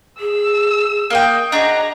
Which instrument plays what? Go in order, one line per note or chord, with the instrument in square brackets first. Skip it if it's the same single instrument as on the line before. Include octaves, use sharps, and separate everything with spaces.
[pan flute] G#4 [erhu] E6
[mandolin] A#3 D#5 G5
[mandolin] D4 F#4 G#4 [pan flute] D#5 [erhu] A#5